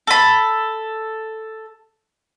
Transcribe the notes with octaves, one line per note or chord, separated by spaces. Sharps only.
A4 B5